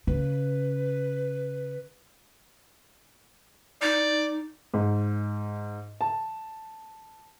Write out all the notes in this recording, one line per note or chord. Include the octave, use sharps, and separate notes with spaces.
C#3 B4
D#4 D5
G#2
A5